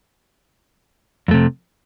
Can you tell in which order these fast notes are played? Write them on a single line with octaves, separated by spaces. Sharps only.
F2 A3 C3